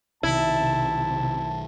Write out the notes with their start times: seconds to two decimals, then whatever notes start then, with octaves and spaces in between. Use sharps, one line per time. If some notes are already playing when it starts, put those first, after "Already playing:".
0.23 B1 C3 D#3 E4 A5